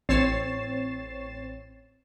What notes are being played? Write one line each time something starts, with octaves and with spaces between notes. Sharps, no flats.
A1 C4 C#5 A6 C7 E7